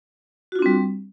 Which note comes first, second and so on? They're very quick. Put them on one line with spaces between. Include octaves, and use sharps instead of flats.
F#4 F4 D4 C4 G3